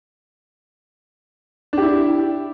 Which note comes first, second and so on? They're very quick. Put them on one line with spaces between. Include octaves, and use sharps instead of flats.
D4 G4 E4